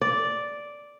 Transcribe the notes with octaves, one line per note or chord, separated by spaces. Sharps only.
D5